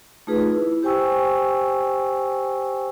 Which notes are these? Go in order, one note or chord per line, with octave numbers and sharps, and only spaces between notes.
A3 D#4 F4 G#4 B4
E4
G4 C5 G5 G#5 C#6 E6